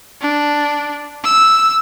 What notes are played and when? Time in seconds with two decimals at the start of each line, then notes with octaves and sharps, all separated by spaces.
0.21 D4
1.24 E6